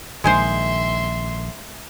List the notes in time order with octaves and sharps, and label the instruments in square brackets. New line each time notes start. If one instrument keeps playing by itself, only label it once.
[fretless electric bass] A#1 D#3 [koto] G#3 G#4 C5 [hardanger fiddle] E5 C6